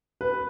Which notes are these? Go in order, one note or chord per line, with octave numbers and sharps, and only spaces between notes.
B4